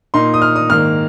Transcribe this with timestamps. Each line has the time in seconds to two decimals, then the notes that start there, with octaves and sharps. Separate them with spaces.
0.14 A#2 A#3 D#4 C6
0.34 D#6
0.42 F6
0.56 D#6
0.70 G#2 D#3 A#3 F6